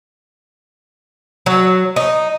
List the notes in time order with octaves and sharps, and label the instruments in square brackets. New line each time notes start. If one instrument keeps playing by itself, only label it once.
[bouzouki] F#3
D#4